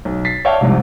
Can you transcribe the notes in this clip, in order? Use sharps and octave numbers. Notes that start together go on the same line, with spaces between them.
B1
A6 B6 C7
C#5 D5 E5 F5 G5 A5
C2 F2 G#2 C3